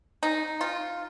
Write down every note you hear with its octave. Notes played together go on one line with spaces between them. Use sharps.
D#4
F4